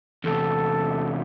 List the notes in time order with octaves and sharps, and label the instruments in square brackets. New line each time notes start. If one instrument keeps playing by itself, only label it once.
[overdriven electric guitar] E2 C3 [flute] A4